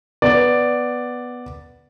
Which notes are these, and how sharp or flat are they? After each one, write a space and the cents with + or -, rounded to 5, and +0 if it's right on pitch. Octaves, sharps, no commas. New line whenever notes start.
B3 +0 D5 +0